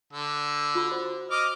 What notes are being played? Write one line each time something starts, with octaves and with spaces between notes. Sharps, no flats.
D3 E6
F4 F#4 B5
F#4 C5
D#5 D6 F6